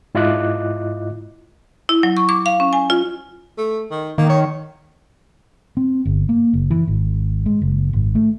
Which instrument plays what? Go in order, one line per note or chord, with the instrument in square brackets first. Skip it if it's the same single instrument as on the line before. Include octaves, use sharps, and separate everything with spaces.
[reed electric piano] G#2 E4 F4 D#5 D6 F#6
[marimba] E4
F#3
C#6
D6
F5
C#4
G#5
F4
[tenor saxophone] A3
D#3
[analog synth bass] D#3 [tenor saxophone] A#3
[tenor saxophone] C#5
[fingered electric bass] C4
G1
A#3
F#1
E3
G#1
G#3
F#1
G#1
A3